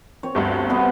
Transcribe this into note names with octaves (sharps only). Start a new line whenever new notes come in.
C4 C#5
G1 D2 G2
C3 B3 B4